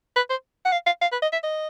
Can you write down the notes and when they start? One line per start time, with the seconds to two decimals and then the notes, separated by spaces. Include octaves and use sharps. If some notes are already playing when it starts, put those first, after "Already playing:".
0.16 B4
0.30 C5
0.65 F#5
0.73 F5
0.86 F5
1.01 F5
1.12 B4
1.22 D#5
1.33 E5
1.44 D#5